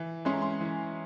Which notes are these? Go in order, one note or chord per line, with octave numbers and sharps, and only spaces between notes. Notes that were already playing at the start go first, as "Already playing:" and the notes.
Already playing: E3
G#3 C#4 E4 C6
A#5
C6
E3